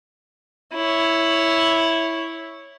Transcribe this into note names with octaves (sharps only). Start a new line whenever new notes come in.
E4 C#5